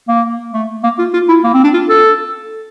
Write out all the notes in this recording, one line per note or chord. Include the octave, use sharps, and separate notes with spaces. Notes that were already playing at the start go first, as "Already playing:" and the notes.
A#3
A3
A#3
F4
F4
E4
A#3
C4
D4
F4
A4